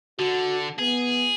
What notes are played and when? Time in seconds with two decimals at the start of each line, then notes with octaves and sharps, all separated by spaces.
0.19 D3 F#4
0.79 B3 G#4